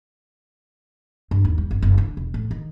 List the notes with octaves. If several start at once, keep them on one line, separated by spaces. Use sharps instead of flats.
G2
D#2
G3
G1
F#1
D3
E1
A2
D#3